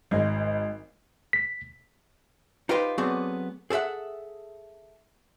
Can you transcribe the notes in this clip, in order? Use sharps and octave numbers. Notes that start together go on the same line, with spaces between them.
G#1 G#3 D#5 G#5
B6
D#4 F4 G4 B4 C5
F#3 A3 B3 C4 G#4 D5
G#4 A4 B4 E5 F#5